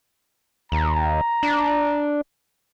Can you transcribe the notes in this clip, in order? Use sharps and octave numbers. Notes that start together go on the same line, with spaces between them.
D#2 A#5
D4